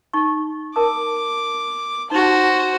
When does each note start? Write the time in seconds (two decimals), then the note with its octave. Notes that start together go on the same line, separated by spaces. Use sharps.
0.13 D#4 C#6
0.76 A#4 A5 D6 D#6
2.10 D#4 F#4 C5 A5